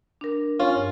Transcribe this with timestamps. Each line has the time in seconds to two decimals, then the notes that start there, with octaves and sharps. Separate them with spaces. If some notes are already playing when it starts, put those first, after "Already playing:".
0.21 D4 A#4
0.60 C#4 F4
0.75 G2